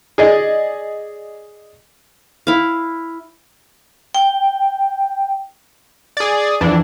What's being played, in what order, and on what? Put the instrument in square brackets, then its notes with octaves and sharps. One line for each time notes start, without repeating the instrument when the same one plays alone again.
[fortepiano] G#4 D5 D#5
[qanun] E4 F5
[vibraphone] G5
[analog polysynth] G#4 D5
F2 E3 D4